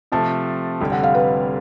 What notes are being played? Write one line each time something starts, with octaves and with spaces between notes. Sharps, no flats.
C3 F3 A3 A5
F1 F2 D3 G3
F#5
F5
B4